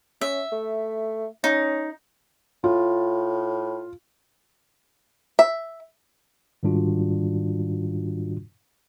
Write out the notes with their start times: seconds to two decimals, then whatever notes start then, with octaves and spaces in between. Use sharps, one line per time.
0.21 C#4 E5
0.52 A3
1.44 C#4 D#4
2.64 A2 F4
5.39 E5
6.63 G#2 D#3 G3 D4 F4 F#4